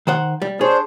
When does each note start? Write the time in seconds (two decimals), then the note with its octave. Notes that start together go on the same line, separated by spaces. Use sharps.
0.07 D#3 C5 F#5
0.42 G3
0.61 D4 G#4 C5 C#5